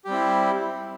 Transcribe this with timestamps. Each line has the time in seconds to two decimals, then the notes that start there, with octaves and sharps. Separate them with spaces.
0.05 G4
0.08 G3
0.10 C4
0.13 E4